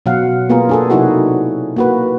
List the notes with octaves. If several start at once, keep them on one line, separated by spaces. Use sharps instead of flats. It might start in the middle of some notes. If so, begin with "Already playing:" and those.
B2 F#3 F5 F#5
A#3 B3 F4 G#4 A#4
D4 G#4 A4
C3 F#3 D#4 E4 F#4 G#4
A#3 F#4 B4